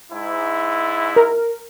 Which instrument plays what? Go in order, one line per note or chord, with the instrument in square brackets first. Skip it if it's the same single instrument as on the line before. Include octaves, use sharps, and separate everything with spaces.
[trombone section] G#2 E4
[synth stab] A#4